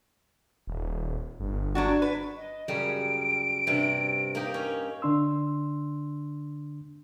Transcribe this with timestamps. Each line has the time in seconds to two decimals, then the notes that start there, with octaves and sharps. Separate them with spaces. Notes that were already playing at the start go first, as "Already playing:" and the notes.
0.67 D#1
1.40 G1
1.75 F#3 D4 F#4
2.02 B4
2.37 D#5
2.68 F#2 C#3 G3 D7
3.67 G2 C3
4.35 A#3 D#4 G4
4.54 C#4
5.02 D3 D4 C6 E6